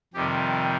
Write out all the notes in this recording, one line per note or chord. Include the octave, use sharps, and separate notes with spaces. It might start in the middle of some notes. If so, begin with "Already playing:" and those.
F2 C3 D#3 G3 G4